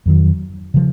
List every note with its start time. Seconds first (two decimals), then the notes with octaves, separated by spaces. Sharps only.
0.06 F2 D#3 F#3
0.74 C#3 F3